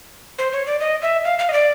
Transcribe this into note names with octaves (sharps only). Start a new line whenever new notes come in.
C5
C#5
D5
D#5
E5
F5
F5
D#5
D5